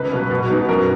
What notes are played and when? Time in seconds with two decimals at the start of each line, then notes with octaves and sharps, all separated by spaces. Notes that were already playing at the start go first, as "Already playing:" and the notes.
Already playing: C#2 B4
0.12 B2 F#3
0.31 B2
0.50 F#3 B3 D#4
0.69 F#2 A#4